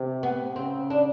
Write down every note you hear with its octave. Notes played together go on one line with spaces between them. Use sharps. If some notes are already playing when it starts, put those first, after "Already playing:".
Already playing: C3
B3
C#3 C4
D4